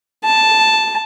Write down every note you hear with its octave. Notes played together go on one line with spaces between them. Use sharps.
A5